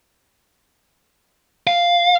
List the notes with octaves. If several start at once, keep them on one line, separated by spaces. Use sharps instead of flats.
F5